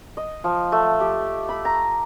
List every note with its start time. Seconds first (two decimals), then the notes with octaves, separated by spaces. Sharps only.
0.17 D#5
0.44 F3
0.72 A3
1.00 G4
1.49 B5
1.65 A#5